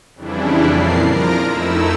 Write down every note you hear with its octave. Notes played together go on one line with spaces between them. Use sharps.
F2 C#3 E3 G3 D4 E4
F2 A#2 A#4 D5 C7
F3 F4 A#4 A#6 D7
F2 A3 D#4 E4 E6